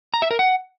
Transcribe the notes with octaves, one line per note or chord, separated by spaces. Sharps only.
A#5
E5
A#4
F#5